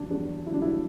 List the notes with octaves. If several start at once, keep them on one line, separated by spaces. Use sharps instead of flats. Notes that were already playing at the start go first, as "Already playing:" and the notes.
Already playing: E2 D3 F#3 D4
E2 D4
D3 F#3 E4
D4
E4